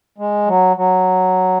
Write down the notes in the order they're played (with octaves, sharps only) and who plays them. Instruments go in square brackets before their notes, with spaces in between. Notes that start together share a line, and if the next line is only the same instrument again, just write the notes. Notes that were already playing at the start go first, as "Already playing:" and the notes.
[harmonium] G#3
F#3
F#3